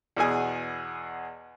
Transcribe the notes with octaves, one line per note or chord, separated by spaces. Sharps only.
E2 B2 G#4 G#5